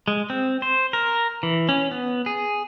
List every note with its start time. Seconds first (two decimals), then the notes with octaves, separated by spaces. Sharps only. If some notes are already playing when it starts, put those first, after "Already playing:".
0.08 G#3
0.30 C4
0.62 C5
0.93 A#4
1.43 E3
1.69 C#4
1.91 B3
2.26 G#4